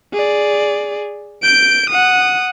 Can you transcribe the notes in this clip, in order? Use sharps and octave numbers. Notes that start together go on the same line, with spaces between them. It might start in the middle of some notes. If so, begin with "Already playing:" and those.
G#4 D5
G6 D7
F#5 D#6